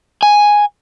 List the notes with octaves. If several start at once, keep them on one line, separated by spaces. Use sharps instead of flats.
G#5